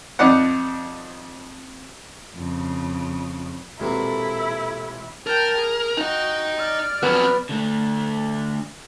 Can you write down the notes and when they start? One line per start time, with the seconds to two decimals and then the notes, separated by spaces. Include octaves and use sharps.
0.19 F2 D#4 D5 F#5
2.35 F2 C#3
3.80 E1 G2 A#2 F#3 C4 E4 A4
5.27 A#4 G5 A5
5.58 G#4
5.97 D#4 F#4 D#5 G5
6.56 D5 F6
7.03 F2 F#3 B3
7.49 D3 A3